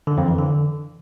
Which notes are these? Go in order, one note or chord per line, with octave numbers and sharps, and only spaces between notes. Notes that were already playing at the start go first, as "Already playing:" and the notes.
D3
F2
E3
D3